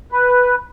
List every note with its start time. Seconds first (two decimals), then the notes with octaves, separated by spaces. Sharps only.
0.12 B4